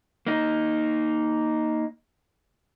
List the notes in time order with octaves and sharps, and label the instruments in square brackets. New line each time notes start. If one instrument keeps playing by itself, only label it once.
[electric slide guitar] A#3 D#4